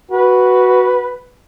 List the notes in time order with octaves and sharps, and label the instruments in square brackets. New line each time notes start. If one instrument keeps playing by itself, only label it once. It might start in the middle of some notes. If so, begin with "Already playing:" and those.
[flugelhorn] F#4 [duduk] B4